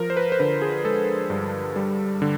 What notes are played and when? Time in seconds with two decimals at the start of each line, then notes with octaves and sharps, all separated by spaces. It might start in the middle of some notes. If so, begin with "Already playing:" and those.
Already playing: F3 A#4
0.10 C5
0.17 B4
0.32 C5
0.40 D3 B4
0.62 G#4
0.85 G#3 A4
1.30 G2
1.76 G3
2.22 D3